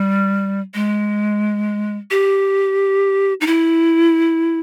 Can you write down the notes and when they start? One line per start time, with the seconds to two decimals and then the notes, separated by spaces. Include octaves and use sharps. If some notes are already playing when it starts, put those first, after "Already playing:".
Already playing: G3
0.74 G#3
2.11 G4
3.41 D#4
3.47 E4